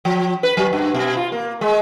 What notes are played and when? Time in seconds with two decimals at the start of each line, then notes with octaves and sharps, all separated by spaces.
0.05 F3
0.43 B4
0.57 F#3
0.73 G2
0.94 B2
1.17 F4
1.32 A#3
1.61 G#3